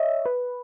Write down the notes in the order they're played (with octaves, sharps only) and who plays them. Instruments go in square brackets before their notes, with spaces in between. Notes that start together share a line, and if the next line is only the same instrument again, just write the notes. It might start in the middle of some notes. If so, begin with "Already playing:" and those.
Already playing: [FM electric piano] C#5 D#5 E5
B4